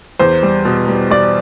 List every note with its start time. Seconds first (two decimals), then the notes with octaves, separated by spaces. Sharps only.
0.19 E2 C5
0.43 G3
0.65 B2
0.88 G3
1.10 G3 D5